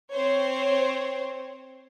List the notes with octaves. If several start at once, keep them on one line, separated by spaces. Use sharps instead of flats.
C4 C5 C#5